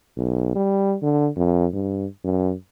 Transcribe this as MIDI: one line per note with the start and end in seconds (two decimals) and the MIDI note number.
0.17 0.54 35
0.55 0.95 55
1.02 1.29 50
1.36 1.66 41
1.73 2.06 43
2.24 2.53 42